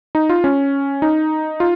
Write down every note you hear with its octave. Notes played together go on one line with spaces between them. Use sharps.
D#4
F4
C#4
D#4
F4